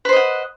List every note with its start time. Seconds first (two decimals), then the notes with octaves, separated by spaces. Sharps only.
0.05 B4
0.09 C5
0.13 D#5
0.16 F#5